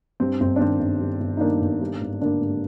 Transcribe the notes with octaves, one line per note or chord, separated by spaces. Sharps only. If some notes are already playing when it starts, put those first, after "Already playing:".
G2 C4
G1 C4
D4
D#3 C4
G1
G2
G1
D#4
D#3 A#3 D4
G1
G2
G#1
D3 A#3 D4
G#1